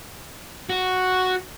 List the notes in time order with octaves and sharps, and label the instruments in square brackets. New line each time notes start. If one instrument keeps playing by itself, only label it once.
[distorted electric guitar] F#4